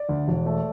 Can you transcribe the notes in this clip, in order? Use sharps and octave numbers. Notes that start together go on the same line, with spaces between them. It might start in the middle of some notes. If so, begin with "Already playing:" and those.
Already playing: D5
D2
E1
A3